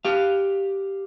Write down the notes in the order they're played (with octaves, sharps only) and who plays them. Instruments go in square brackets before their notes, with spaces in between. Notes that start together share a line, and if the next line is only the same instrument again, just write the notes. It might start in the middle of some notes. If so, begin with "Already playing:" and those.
[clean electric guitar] G4 F5